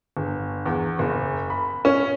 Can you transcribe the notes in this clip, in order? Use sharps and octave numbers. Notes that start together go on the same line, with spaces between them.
G1
E2
F#1
B5
C#4